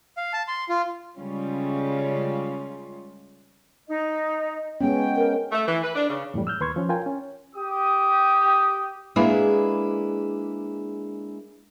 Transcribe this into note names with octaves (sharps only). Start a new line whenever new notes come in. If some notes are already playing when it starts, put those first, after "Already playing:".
F5
A5
C6
F4
C#3 G3 G#3 C#4 F4
D#4 D#5
G#3 B3 C#4 G5
A#4
A3
E3
B4
D4
C#3
F2 A2 E3 G3
E6 F6 G6
D#2 B4 C6 C#6 G#6
F3 C#4
F4 A#4 G5 G#5
C#4
G4 D#6
G#3 A#3 D4 E4 G#4 B4